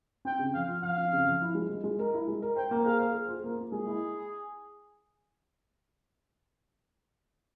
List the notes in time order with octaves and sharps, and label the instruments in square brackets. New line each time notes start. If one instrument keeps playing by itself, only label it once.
[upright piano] C4 [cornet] G5
[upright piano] C#3
[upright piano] F3 [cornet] F5
[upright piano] F4
[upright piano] F3 [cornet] F5
[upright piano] C4
C#3
F3
E4
G#3
G#3
G#3
A#4
E4
G#3
A#4
[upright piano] C5 [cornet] G5
[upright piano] A#3
[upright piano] G#4 [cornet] F5
[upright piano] C5
G#4
F4
A#3
A#3
[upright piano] G#3 [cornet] G#4
[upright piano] E4